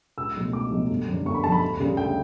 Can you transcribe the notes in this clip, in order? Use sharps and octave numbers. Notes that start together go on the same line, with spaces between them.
C#2 E6
B2 F#3 A3
C#2 D6
B2 F#3 A3
G1
F#2 D3
G1 C#6
B5
D3 A5
F#2 B5
D2
C#3 G3
D2 G5